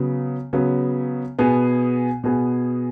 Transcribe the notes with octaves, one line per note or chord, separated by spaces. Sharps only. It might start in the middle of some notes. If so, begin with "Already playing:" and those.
Already playing: C#3 F#3 B3
C#3 F#3 B3
B2 B3 G#4
B2 B3 G#4